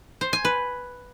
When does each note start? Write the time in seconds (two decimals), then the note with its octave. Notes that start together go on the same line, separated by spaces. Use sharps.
0.21 C5
0.33 G#5
0.45 B4